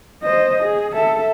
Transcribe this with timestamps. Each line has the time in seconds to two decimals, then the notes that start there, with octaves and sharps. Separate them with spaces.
0.23 C5 D#5
0.62 G#4
0.93 A4 E5